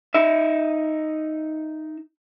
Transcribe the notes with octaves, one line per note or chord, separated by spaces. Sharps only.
D#4 E5